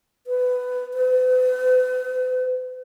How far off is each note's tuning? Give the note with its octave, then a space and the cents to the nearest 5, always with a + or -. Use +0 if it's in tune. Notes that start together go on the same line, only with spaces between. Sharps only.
B4 +15
B4 +45